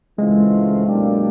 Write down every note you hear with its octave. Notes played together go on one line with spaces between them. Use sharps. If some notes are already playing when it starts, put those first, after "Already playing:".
C#3 E3 G#3 A3 C4 F4
B2 F#3 A#3 D4 G4